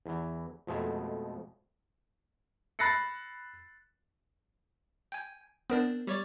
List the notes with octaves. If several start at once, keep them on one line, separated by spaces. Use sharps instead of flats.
E2 E3
F2 B2 G#3 A3
B5 F#6 A6 A#6 C7 C#7
G5 G#5
B3 C4 D4 A#4
G3 C#5 D5